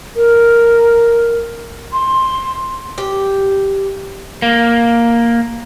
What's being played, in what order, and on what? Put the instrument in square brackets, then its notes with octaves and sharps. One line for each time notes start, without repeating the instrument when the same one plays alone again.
[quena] A#4
C6
[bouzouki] G4
[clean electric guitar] A#3